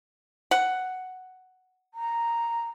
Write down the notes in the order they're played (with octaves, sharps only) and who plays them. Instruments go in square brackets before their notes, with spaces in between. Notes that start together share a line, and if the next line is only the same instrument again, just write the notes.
[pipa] F#5
[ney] A#5